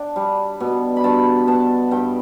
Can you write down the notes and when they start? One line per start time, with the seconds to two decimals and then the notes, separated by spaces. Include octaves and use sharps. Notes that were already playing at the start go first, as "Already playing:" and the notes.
Already playing: D4 G5
0.16 G3
0.60 B2
0.97 B5
1.04 G2 A5
1.47 B3 A5
1.91 G2 G5